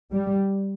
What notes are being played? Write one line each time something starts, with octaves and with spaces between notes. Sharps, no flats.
G3